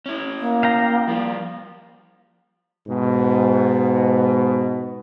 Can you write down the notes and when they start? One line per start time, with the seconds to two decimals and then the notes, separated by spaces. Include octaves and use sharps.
0.06 C#4 E4
0.38 A#3
0.63 F5 G5 A#5
1.08 F3 G3
2.88 G#2 B2